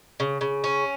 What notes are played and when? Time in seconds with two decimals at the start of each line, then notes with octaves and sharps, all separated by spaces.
0.20 C#3
0.41 C#3
0.64 C#4